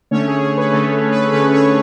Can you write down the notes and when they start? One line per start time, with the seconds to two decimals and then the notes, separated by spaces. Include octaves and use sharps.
0.11 D3 A3 C#4 C#5
0.27 G#4
0.42 G#4
0.57 B4
0.72 D3 A3 C#4 A4
1.12 B4
1.33 D3 A3 C#4 B4
1.54 C#5